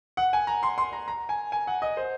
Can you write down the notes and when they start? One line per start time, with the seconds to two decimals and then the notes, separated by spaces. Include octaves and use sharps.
0.17 F#5
0.33 G#5
0.47 A#5
0.63 C6
0.78 C6
0.93 A#5
1.08 A#5
1.29 G#5
1.52 G#5
1.67 F#5
1.82 D#5
1.97 C5